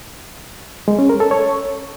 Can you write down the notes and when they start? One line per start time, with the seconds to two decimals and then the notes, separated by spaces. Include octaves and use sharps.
0.88 G#3
0.99 C#4
1.09 A#4
1.20 A4
1.31 C#5